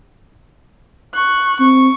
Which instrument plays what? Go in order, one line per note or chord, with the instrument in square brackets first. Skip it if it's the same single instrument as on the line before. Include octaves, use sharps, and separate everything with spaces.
[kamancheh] C#6 F#6
[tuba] C4 [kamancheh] C#6